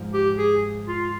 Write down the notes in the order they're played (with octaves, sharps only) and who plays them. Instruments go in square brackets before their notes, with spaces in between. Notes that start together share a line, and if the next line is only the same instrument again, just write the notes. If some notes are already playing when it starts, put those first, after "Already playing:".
Already playing: [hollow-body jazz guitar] G#2 F3
[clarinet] G4
G#4
F4